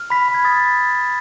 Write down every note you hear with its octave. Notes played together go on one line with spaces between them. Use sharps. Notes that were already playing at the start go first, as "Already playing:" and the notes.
Already playing: F6
B5 B6
B5
G#6
D#6 A6